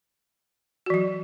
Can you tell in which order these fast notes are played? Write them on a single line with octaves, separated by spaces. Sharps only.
F#4 E3 F#3